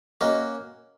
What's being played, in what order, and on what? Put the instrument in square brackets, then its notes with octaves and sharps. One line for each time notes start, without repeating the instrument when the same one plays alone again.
[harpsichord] A#3 C#4 F#4 [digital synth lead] D#5